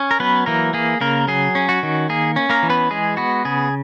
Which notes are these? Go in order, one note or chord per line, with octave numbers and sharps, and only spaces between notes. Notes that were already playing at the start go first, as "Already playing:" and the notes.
Already playing: C#4
A#4
F#3 B3 B4
E3 A#3 A#4
A#3 G#4
C#3 A#3 A#4
F#3 G#4
C#4
F#4
D#3
A#3 G#4
C#4
A#3 A#4
E3
B3 B4
G#3 G#4
B3 F#4
C#3 G#4